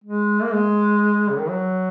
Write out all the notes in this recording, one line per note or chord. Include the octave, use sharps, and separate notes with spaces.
G#3
A#3
G#3
C#3
D#3
F#3